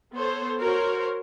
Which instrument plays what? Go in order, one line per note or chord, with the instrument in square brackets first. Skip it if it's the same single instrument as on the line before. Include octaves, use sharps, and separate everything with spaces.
[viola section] B3 A4 C5 C#5
F#4 A#4 C5 C#5